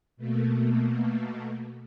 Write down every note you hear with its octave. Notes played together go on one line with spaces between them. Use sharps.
B2 A3 A#3